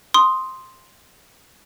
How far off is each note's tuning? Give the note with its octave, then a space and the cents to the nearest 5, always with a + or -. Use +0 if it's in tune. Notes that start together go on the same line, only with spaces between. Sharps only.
C6 +0 D#6 +0